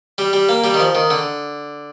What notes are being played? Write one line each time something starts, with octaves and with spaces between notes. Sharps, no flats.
G3
G3
A#3
G3
D#3
F3
D#3
D3